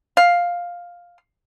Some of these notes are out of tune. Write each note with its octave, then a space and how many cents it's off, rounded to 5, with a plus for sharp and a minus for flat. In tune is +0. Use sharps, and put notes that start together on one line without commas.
F5 +5